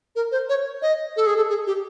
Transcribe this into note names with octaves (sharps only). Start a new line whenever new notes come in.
A#4
C5
C#5
D#5
A4
G#4
A4
G#4
G4